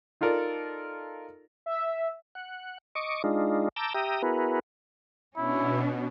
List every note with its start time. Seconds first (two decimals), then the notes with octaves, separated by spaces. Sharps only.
0.21 D#4 F4 A4 A#4 D5
1.66 E5
2.35 F#5
2.95 D#5 C#6 D6
3.24 G#3 D4 D#4 F4
3.76 A5 A#5 D6 E6 G6
3.94 G4 E5 G5 A#5 D#6
4.23 B3 E4 F#4 G#4 A#4 B4
5.36 B2 C#4 D4 E4